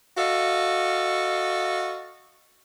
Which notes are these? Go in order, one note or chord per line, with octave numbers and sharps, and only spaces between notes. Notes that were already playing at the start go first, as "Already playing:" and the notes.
F#4 A4 D#5 F5